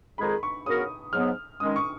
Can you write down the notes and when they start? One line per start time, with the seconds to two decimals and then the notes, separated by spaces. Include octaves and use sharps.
0.18 F2 D#3 G#3 D#4 G#4 B5
0.43 C#6
0.66 C#3 F#3 B3 F#4 A#4 D#6
1.13 G#2 F#3 B3 F6
1.60 D#3 G#3 C#4 D#6
1.76 C#6